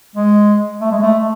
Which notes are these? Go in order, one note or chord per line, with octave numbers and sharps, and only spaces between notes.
G#3
A3
G#3
A3